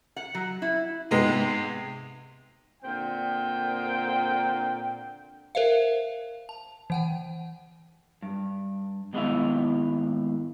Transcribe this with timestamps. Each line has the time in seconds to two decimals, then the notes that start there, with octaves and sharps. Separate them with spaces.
0.16 F#5
0.35 F#3
0.62 E4
1.11 G#2 C3 G#3 B3 C4
2.83 A#2 D3 C4 G5
5.55 A#4 C5 E5 F5
6.49 A5
6.90 E3 F#5 G5
8.22 G2
9.13 D#2 G#2 G#3 B3 E4 F5